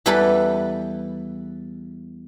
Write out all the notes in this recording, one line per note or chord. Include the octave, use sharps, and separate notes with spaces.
E2 E3 G3 G4 A4 B4